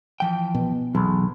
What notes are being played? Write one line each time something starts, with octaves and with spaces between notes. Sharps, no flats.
E3 F3 G5
B2
B1 E2